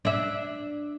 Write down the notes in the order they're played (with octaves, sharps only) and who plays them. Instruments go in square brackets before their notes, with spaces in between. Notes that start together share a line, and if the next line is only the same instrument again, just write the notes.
[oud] D4 E5